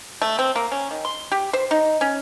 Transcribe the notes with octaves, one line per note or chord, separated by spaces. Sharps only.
A3
C4
A#3
C#4
D#3
C6
G4
C5
D#4
C#4